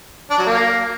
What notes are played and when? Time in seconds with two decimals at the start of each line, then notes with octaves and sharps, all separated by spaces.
0.31 D4
0.38 F#3
0.46 A#3